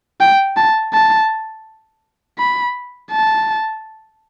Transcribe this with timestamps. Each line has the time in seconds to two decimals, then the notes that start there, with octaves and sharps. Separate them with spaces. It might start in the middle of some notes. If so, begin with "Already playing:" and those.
0.20 G5
0.57 A5
0.93 A5
2.38 B5
3.11 A5